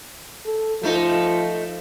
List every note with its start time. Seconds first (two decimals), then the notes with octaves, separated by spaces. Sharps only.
0.46 A4
0.83 F3 A3 D#4